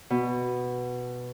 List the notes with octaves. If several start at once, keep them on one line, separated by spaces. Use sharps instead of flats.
B2